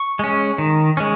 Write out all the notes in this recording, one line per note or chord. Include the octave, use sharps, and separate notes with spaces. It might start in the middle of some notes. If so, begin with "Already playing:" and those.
Already playing: C#6
G#3 C#4
D#3
G#3 C#4